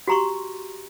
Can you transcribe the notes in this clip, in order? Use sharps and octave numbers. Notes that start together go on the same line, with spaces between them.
F#4 G4 A#5 C6 C#6